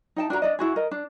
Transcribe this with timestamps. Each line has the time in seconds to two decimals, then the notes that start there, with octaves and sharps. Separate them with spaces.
0.16 D#4 G5 A5
0.30 D4 F#4 A4 A#5
0.42 D4 D5 D#5
0.59 E4 F#4 G#4
0.76 A#4 D#5
0.91 D4